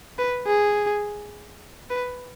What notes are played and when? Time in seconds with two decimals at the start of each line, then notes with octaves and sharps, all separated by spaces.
0.18 B4
0.47 G#4
1.90 B4